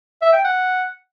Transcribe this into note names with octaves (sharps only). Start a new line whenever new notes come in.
E5
G5
F#5